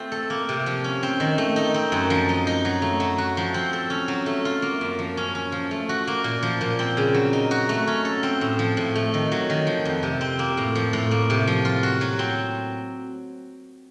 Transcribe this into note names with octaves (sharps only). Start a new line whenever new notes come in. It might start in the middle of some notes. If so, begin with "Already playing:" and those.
Already playing: A3 C4 F4
A4
A#3
C3
F3
C#4
C4
D#3
A3
D#4
C4
F#2
F3
D#4
D#4
F#3
A3
F#3
F#4
F3
C4
A4
C#4
F#3
A3
F4
A#3
F#2
F3
C#4
C#4
F3
A3
F#4
A#3
A#2
F3
A#2
C4
C#3
F#3
D#4
F#4
A3
C#4
A4
C4
A2
F3
A2
A3
D#3
F#3
D#3
F3
F2
C3
C4
A#3
A2
F3
A2
A#3
C3
F3
F4
F#4
F#3
C4